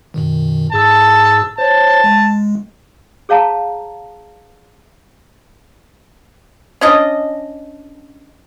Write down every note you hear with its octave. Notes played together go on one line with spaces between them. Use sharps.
F#2 B2 D#3
G#2 G#4 A5 E6
C5 C#5 A5
G#3
G#4 C#5 F5 A5 A#5
C#4 D4 D#5